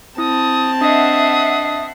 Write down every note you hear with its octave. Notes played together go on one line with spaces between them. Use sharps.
C4 E4 A5 D#6
D4 D#5 E5 F#5 D#6 C7